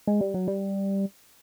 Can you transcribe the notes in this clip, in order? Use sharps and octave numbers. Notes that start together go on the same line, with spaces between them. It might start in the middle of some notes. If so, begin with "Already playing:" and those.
G#3
G3
F#3
G3